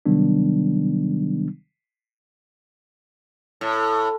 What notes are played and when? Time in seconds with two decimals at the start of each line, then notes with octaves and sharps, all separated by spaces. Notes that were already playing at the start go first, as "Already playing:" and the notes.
0.06 C3 D#3 F#3 G3 B3 D4
3.61 A2